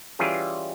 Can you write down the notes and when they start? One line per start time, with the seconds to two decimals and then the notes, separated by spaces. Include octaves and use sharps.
0.19 E3 G3 C#4 F4 G#4